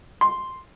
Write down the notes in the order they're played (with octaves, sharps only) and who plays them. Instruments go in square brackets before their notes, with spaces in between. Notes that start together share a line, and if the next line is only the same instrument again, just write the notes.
[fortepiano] C6